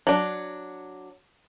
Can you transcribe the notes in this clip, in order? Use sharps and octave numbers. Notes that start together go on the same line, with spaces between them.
F#3 D4